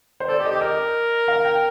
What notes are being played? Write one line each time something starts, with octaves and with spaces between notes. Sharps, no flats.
C5
A4 D5
G4
D#5
G4
A#4 D#5
F5
G5